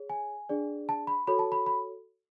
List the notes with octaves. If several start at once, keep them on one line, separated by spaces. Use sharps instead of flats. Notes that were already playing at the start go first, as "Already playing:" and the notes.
Already playing: G#4 C#5
G#5
D4 G#4 D5
A5
B5
F#4 A4 C#5 B5
A5
B5
B5